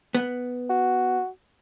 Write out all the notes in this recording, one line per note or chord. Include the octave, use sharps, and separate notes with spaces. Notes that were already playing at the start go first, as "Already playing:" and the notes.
B3
F#4